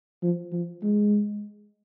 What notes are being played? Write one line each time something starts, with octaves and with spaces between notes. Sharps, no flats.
F3
F3
G#3